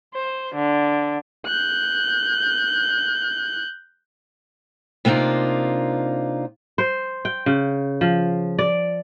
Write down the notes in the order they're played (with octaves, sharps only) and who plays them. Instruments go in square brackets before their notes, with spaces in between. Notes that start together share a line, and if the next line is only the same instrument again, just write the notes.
[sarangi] C5
D3
[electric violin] F#6 G6
[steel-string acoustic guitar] C3 A#3 B3 D4 D#4 F4
[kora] C5
G5
C#3
F3
D5